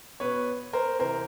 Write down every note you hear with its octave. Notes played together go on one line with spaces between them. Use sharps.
B2 B4 C#5
A#4 C5
C3 E3 A#4 C5